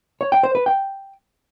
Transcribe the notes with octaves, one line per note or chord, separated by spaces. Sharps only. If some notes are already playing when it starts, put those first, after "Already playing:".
C#5
G5
C5
B4
G5